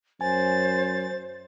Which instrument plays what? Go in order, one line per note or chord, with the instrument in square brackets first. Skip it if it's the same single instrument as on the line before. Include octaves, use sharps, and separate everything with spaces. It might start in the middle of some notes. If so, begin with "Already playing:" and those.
[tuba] F#2 [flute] C5 [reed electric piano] G#5 [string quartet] A6